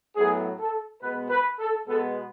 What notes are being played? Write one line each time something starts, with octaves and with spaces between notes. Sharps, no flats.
A2 F#3 B3 G#4
A4
B2 G#3 B3 B4
B4
A4
B2 G#3 B3 A4